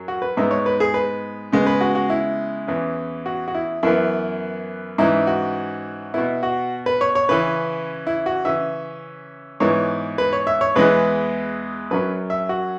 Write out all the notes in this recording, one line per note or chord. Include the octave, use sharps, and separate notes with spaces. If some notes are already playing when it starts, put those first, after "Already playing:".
Already playing: F#2 F#3
F#4
B4
G#2 G#3 B3 E5
C#5
B4
G#4
B4
C#3 G#3 B3
B4
F#4
F#4
E4
E2 E3 C#4
F#4
F#4
E4
F#2 E3 B3 E4
G#2 E3 C#4 E4
F#4
B2 B3 E4
F#4
B4
C#5
C#5
C#3 E3 C#4 B4
E4
F#4
C#3 E3 C#4 E5
G#2 E3 B3 C#5
B4
C#5
E5
C#5
E2 E3 G#3 B3 B4
F#2 F#3 C#4 B4
E5
F#4